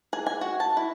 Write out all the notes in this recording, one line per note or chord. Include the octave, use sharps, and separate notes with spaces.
G#4
G#5
F#4
A5
E4